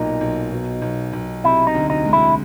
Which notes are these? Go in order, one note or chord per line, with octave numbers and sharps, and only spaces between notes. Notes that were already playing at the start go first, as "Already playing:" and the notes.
Already playing: B1 A#2 D#4
B1
B2
B1
B1
C3 E4
D#4
D2
D#4
G#3
E4